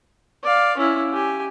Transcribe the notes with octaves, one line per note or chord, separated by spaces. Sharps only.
D5 F5
C#4 E4
G4 G#5